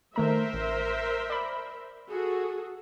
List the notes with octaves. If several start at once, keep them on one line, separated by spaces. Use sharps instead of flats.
D#3 A3 A#4 C5 E5 A#5
A1
D5 B5
F#4 G#4 A4